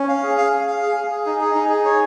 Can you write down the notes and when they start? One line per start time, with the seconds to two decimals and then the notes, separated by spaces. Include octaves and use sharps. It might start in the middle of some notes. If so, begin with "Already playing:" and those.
Already playing: C#4
0.08 F5
0.23 G#4
0.37 F5
0.52 F5
0.67 F5
0.82 G#4
0.96 G#4
1.11 G#4
1.26 D#4
1.41 G#4
1.55 D#4
1.69 G#4
1.85 C#5